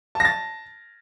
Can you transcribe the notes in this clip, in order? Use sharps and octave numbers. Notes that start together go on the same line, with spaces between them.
A5 A6 A#6